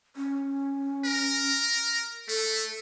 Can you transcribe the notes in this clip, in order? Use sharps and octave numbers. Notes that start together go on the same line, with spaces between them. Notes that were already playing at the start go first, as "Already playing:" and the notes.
C#4
A#4
A3 A4